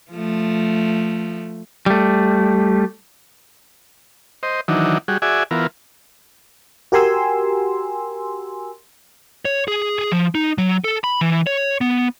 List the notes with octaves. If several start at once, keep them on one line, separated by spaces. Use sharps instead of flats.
F3 A3
G3 A3
C5 D#5
D#3 E3 F#3 D4 D#4
G3 F#4 G#4
F#4 G#4 D5 E5 G#5
E3 B3 F4 A#4
F#4 G4 A#4 G#5 C6 E6
C#5
G#4
G#4
F3
D#4
F#3
A4
B5
E3
C#5
B3